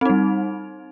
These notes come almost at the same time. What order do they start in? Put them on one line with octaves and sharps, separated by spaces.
C4 D#4 G3